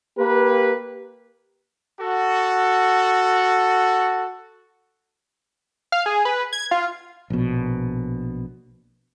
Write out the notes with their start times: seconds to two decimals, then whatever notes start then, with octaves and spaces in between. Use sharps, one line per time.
0.18 A#3 G4 B4
2.00 F#4 A4
5.92 F5
6.06 G#4
6.25 B4
6.53 G#6
6.71 F4
7.30 A#1 B2